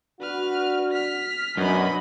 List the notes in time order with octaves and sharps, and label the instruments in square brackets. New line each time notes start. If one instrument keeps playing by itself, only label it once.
[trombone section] D4 F#4 [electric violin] B4 F6
[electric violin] F6 B6
[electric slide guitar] F#2 [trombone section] B2 D4 [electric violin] D#5 B5